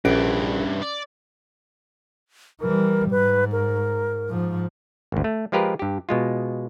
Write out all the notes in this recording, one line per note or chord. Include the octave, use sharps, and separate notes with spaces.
A#1 G2 E3 C#4 D7
D5
E3 G3 A#4
G#2 B4
A#4
G#2 F3
G#1 D2
A3
F3 G#3 F4 G4 A#4 B4
G2 G4
B2 G#3 F4